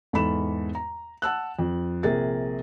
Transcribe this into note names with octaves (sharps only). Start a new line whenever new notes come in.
E2 G#2 A4 B5 E7
A#5
F#5 A5 E6 F#6
F2
A#1 C3 G#4 A#4 A6